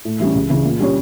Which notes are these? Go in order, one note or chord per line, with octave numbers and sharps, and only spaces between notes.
A2
E3 G3 C#4
C#2
C#3 E3
A#2
G3 C#4 G4 C#5